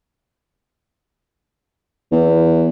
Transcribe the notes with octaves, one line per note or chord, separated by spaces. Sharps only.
E2